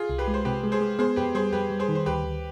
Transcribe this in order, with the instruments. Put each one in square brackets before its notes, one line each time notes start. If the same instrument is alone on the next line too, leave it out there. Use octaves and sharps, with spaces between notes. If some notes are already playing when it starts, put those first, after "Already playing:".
Already playing: [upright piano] F4 G#4
[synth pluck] C2
[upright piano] G4 B4
[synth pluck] G#3
[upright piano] C5
[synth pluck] C3 [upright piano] G4 B4
[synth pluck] G#3
[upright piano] G#4 C5
[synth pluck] G#3
[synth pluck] B3 [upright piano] G#4 C5
[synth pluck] F2 [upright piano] G4 B4
[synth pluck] G3 [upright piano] G#4 C5
[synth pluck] F2 [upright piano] G4 B4
[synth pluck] G3
[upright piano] G#4 C5
[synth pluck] D#3
[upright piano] C5
[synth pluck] D2 [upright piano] G4 B4
[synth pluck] D2